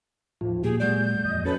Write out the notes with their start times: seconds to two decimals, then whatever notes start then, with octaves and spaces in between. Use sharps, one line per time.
0.41 D#2 A2 F3
0.64 A#2 G4 G#4
0.80 F#3 G#3 D5 G6
1.25 F2 D#5
1.45 C#4 F#4 A4 B4 A6